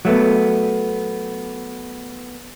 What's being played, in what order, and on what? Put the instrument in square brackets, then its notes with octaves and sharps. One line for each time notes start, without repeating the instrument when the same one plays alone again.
[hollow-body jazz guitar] F#3 A3 B3